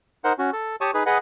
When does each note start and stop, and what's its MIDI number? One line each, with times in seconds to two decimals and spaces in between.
0.24 0.33 63
0.24 0.33 70
0.24 0.33 72
0.24 0.33 78
0.39 0.50 61
0.39 0.50 66
0.53 0.76 69
0.81 0.91 67
0.81 0.91 73
0.81 0.91 81
0.81 0.91 85
0.81 0.91 87
0.94 1.04 63
0.94 1.04 68
0.94 1.04 71
1.06 1.18 68
1.06 1.18 71
1.06 1.18 75
1.06 1.18 78